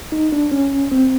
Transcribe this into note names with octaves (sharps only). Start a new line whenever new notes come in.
D#4
D4
C#4
C4